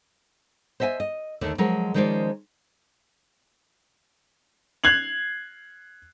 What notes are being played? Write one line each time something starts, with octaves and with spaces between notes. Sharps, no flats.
C5 D#5 E5 F#5 G#5
D#5
D#2 D3 A3
F3 F#3 G#3 G#4 A#4
D#3 F3 G#3 C#4 C5 D5
F#6 G#6 C7 F7 F#7